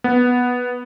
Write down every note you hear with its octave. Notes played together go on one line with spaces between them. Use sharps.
B3